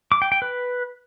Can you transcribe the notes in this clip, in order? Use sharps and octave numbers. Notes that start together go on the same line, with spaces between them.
D6
G5
G5
B4